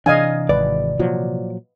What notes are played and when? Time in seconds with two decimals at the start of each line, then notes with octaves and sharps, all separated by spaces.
0.06 C3 E3 D4 D#5 F5 G#5
0.49 G#1 B4 D5
0.99 A#2 F3 F#3